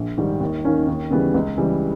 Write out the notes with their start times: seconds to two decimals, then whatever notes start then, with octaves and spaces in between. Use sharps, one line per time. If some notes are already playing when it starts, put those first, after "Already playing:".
Already playing: A#1
0.17 G#2 D#3 G3
0.40 D#2
0.65 D#3 A#3 C#4
0.88 D#2
1.10 C#3 E3 G3 B3
1.34 C#2
1.57 C#3 E3 G3